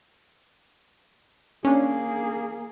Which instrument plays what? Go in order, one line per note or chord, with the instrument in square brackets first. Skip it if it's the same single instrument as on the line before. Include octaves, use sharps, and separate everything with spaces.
[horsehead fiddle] A#3 G#4 [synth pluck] C#4 D4